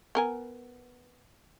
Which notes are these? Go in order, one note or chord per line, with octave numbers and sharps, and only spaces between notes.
B3 A#4 G#5